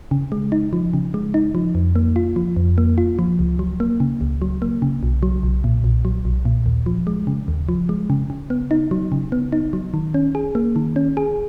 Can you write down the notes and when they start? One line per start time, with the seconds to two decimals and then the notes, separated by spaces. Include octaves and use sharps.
0.11 C#3
0.32 G#3
0.52 D#4
0.73 F3
0.94 C#3
1.14 G#3
1.34 D#4
1.55 F3
1.75 F2
1.96 A#3
2.16 F4
2.36 F3
2.56 F2
2.78 A#3
2.98 F4
3.19 F3
3.39 C#2
3.59 F#3
3.80 A#3
4.00 C#3
4.21 C#2
4.42 F#3
4.62 A#3
4.82 C#3
5.03 B1
5.23 F#3
5.43 B1
5.64 A#2
5.84 B1
6.05 F#3
6.25 B1
6.45 A#2
6.66 D#2
6.86 F3
7.07 G#3
7.27 C#3
7.48 D#2
7.69 F3
7.89 G#3
8.10 C#3
8.30 C#3
8.50 B3
8.71 D#4
8.91 F#3
9.12 C#3
9.32 B3
9.52 D#4
9.73 F#3
9.94 D#3
10.14 C#4
10.35 G#4
10.55 A#3
10.76 D#3
10.96 C#4
11.17 G#4